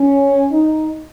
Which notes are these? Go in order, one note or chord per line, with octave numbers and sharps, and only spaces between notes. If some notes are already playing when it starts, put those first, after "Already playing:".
Already playing: C#4
D#4